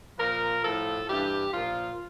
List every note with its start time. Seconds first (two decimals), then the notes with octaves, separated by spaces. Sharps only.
0.19 A#2 F3 A#4
0.64 A2 F3 A4
1.09 G2 E3 G4
1.53 A#2 F3 F4